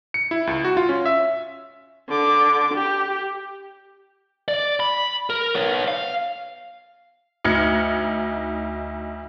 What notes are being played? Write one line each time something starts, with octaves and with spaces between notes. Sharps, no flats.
C#7
E4
C#2
F#4
F4
C#4
E5
D3 D6
G4
D5
B5
A#4
B3 C#5
F5
D2 D#4 F6 G#6 C#7